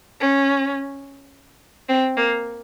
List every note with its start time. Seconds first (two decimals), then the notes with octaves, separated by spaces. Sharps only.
0.20 C#4
1.89 C4
2.17 A#3